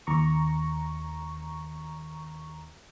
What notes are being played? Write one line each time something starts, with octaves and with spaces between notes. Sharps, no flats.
D#2 A#5 C#6